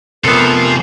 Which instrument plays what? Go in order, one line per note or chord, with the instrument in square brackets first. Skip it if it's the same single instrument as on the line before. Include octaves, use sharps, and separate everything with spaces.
[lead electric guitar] C3 F3 [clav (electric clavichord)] B3 A4 [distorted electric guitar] F4 C5 [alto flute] A#4